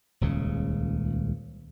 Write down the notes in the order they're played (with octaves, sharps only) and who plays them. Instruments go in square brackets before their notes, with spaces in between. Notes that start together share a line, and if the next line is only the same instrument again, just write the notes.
[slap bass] D#1 C#2 C#3